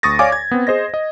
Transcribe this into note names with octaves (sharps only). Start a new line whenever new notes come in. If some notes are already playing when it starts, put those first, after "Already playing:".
D2 C#6 D#6 A6 A#6
C#5 D5 F5 G#5 D6
G#6
B3 C4
G#4 C5 D#5 A#6
D#5